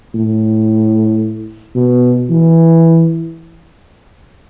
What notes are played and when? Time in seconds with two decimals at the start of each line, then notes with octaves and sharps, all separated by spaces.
0.15 A2
1.75 B2
2.30 E3